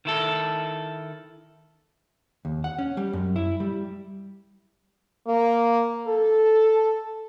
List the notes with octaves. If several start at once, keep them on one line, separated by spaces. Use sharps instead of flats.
D#3 E4 A4
D#2
F#5
C#4
G3
F#2
E4
G3
A#3
A4